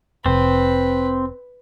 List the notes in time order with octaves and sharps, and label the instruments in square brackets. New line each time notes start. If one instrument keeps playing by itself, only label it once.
[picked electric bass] F1 [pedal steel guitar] C4 [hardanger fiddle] B4